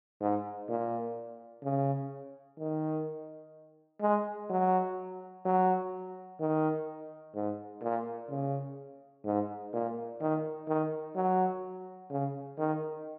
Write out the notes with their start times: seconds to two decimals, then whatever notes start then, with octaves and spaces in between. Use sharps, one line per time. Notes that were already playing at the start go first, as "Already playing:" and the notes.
0.21 G#2
0.69 A#2
1.63 C#3
2.59 D#3
4.01 G#3
4.49 F#3
5.45 F#3
6.40 D#3
7.35 G#2
7.82 A#2
8.29 C#3
9.25 G#2
9.73 A#2
10.20 D#3
10.68 D#3
11.16 F#3
12.11 C#3
12.58 D#3